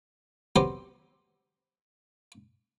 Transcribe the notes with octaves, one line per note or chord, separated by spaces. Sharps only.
F#3 B3 C4 G4 C5